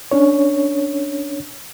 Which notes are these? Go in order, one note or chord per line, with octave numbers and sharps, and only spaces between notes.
C#4 D4 C#5